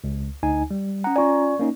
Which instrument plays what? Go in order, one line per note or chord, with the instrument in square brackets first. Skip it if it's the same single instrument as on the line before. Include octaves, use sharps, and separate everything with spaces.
[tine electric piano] C#2
D2 D#4 G#5
G3
[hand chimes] C#4 A#5 [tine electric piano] F#5
[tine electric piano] C#4 F4 G#5 [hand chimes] D5 C#6
[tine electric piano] A#3 C#4 D#4